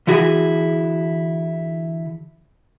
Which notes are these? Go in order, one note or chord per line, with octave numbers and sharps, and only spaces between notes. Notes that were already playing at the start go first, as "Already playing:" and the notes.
D3 E3 E4 F#4 G#4